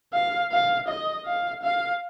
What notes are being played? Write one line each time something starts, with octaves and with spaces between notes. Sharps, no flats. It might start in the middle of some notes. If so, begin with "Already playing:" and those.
F5
F5
D#5
F5
F5